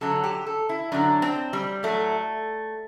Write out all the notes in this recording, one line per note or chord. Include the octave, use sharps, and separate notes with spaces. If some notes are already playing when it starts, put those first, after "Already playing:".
F#2 D3 F#3 A4
G4
A4
E4
F#2 D3 F#3 D4
C4
G3
A2 F#3 A3